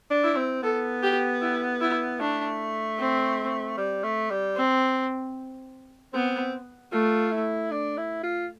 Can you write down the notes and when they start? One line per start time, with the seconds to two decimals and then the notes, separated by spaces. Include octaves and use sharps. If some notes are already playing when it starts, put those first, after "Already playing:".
0.11 D4
0.24 E4
0.37 C4
0.63 B3 A4
1.03 G4
1.41 E4
1.81 E4
2.20 A3 D4
2.99 C4
3.78 G3
4.04 A3
4.30 G3
4.56 C4
6.14 B3 C4
6.92 A3 F4
7.32 E4
7.71 D4
7.98 E4
8.23 F4